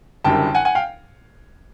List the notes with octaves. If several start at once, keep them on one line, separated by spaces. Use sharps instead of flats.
F#1 F#2 D3 G3 G5 A5
F#5 G#5
F#5 G#5
F5 G5